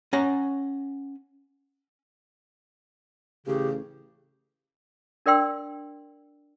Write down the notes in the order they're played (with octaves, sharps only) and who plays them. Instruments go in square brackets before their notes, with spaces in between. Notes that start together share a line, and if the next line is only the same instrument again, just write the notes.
[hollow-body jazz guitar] C#4 F#5 A#5
[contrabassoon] A1 [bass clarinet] C#3 [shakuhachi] G4
[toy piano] D4 A#4 D5 G5 C6 E6